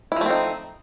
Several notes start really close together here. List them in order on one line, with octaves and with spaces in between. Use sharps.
E4 F3 A3 C4 D#4